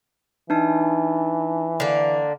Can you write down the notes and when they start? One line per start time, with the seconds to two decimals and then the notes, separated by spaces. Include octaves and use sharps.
0.50 E3 D4 D#4 A5
1.80 D3 A#3